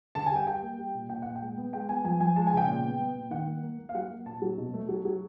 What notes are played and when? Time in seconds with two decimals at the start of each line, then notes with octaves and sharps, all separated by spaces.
0.15 D3 A5
0.26 G3 G#5
0.36 G5
0.47 G3 G5
0.62 A#3
0.78 G3
0.95 A#2
1.09 A#2 G5
1.22 A#2 F#5
1.35 G5
1.41 G#3
1.57 B3
1.73 G#3 G5
1.89 B3 G#5
2.04 F3 G#5
2.20 F3 G#5
2.36 G#3 A5
2.47 G#5
2.53 C#3 G5
2.68 A#2
2.84 B3
3.00 B3
3.15 A#2
3.31 D#3 F#5
3.47 A#3
3.63 A#3
3.78 A#3
3.89 F5
3.95 F#3 F#5
4.10 A#3
4.26 A#2 A5
4.42 F#3
4.58 B2
4.74 A3
4.89 F#3
5.05 F#3